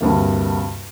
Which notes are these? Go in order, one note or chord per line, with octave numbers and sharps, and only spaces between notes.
D2 G2 C3 A#3